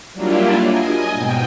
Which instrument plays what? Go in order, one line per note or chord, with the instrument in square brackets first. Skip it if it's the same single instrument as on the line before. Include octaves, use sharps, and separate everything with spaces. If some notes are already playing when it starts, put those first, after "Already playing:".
[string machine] F#3 G3 A#3 D4 E4 F4
D#5 G#5
G#2 B2 G5